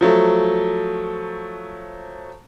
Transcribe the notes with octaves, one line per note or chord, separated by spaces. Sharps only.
F3 F#3 A3